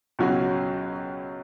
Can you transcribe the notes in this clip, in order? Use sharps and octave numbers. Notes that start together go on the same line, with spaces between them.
C#2 B2 F#3 C#4 F#4